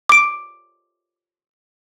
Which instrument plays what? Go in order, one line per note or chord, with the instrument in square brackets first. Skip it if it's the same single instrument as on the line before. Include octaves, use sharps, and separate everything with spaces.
[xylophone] D6 D7